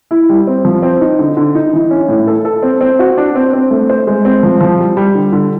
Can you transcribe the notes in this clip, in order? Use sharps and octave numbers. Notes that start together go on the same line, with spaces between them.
E4
G3
C4
F3
C4
D#4
D3
D3
D#4
E3
C#4
A2
A4
A4
C4
C4
F#4
D4
C4
C4
A3
C5
G#3
C4
F3
F3
G3
G3
D3
D3